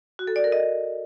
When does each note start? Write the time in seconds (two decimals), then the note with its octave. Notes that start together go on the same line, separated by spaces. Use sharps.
0.19 F#4
0.27 A4
0.36 D5
0.44 A#4
0.52 D#5